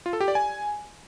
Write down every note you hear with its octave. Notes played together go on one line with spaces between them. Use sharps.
F4
A4
G4
D5
G#5